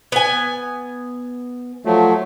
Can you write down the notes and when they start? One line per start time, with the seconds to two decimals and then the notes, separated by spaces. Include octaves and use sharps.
0.12 B3 G#5
1.85 F3 F#3 A3